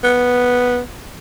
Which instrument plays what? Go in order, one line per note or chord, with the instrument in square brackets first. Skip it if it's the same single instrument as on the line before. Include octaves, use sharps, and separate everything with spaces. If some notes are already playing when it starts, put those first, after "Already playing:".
[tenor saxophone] B3